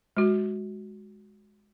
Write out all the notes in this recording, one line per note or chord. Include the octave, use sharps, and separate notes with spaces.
G#3 F#4